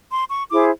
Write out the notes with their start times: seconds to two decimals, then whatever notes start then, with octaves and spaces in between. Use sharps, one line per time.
0.11 C6
0.30 C#6
0.50 E4 G#4 C5 D6